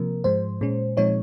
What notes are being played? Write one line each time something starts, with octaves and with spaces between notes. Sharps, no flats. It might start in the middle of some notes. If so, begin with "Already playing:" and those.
Already playing: C3 F3 A#3 A#4
G#2 F3 G#3 C5
A#2 G#3 C#4
A#2 F3 G#3 C4 D#4 C#5